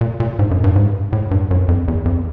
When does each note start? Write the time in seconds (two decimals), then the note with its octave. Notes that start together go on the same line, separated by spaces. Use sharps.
0.01 A#2
0.20 A#2
0.39 G#2
0.51 F#2
0.64 G2
0.76 G#2
1.13 A2
1.31 G2
1.51 F#2
1.68 F2
1.88 E2
2.05 F2